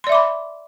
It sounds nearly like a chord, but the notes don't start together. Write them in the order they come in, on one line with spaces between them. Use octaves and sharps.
C6 D5 E5 D6 B5